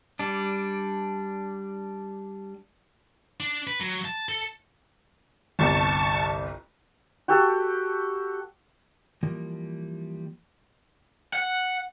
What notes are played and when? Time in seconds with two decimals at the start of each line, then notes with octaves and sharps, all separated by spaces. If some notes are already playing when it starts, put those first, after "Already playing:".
0.19 G3 D4
3.40 D4
3.67 B4
3.81 F#3
4.05 A5
4.29 A4
5.59 G1 C2 A5 C#6
7.28 F#4 G4 A4
9.23 E3 F3 G3 A#3
11.33 F#5